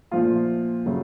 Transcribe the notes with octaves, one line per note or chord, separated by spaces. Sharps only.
A#2 F3 A3 F4
C#3 F#3 A3